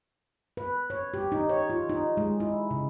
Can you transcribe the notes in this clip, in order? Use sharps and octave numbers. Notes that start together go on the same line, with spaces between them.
B4
C#5
G4
D#4
C#5
F4
D#4
G#3
E4
C#3